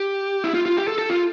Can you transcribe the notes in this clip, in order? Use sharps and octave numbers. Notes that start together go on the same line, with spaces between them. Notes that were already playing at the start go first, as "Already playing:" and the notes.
Already playing: G4
E4
F4
F4
G4
A4
A4
F4